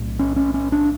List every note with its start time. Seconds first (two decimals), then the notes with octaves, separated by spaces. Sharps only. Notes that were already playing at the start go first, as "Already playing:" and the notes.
Already playing: B1 A2
0.19 C#4
0.36 C#4
0.54 C#4
0.72 D4